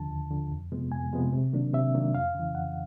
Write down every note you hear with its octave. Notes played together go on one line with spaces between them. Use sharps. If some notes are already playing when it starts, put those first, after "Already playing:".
Already playing: D#2 D3 F3 A5
D#2
D3 F3
F2
C3 F3 G#3 B3
F2 G#5
C3 F3 G#3 B3
C3
D#3 F#3 A#3 D4
C3 E5
D#3 F#3 A#3 D4
F2 F5
C#3 E3
F2 F#5